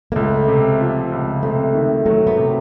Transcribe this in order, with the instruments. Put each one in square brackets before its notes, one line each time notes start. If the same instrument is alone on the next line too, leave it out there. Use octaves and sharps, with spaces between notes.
[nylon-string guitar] A#3
[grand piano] C#2 [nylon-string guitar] A3
[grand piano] C3
F3
C#2
[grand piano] C3 [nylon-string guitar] A3
[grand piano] D#3
[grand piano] F#3 [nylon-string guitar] A3
[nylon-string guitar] B3
[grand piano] C3